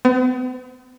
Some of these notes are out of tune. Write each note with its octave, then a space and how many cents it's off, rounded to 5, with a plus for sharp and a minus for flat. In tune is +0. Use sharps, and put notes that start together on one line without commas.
B3 +45